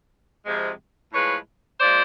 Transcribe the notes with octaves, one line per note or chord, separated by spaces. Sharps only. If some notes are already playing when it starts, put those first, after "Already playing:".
F2 C3 F3 G#3
A2 F3 G#3 B4 C#5
A#2 F3 G#3 C5 D5